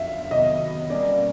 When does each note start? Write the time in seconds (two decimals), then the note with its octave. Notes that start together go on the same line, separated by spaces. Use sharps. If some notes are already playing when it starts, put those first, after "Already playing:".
Already playing: F2 D3 F#3 E5 F5
0.31 C3 D#3 F#3 B3 D#5
0.89 B2 G3 A#3 C#4 D5